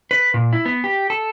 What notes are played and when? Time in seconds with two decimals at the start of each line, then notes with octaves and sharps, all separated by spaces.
0.11 B4
0.34 A#2
0.53 E4
0.66 B3
0.84 G4
1.10 A4